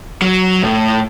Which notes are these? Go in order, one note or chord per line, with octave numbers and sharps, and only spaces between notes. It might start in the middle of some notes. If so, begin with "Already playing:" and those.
F#3
A2